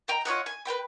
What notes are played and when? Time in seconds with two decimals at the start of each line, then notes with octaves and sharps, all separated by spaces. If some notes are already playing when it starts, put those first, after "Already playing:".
0.08 D#5 G5 A#5
0.25 F4 C#5 D#5 F#5
0.46 G#5
0.65 B4 C#5 G5 B5